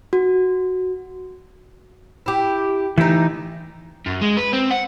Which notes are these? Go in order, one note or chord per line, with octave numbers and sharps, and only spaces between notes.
F#4
E4 G4
E3 A3 D#4 G4
F#2
G#3
B4
C4
F#5